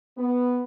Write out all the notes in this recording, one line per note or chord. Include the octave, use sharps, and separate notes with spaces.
B3